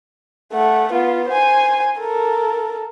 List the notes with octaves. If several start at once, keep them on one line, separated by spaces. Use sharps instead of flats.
A3 F#5
B3 F4
C5 G#5
A4 A#4